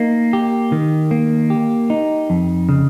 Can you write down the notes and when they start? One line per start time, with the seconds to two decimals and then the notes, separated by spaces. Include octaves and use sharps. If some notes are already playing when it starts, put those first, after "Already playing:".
Already playing: A#3 D#4
0.33 G4
0.72 D#3
1.11 A#3
1.50 G4
1.90 D#4
2.30 F2
2.69 C#3